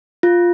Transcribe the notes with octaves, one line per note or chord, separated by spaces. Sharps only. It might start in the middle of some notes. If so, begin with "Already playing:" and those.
F4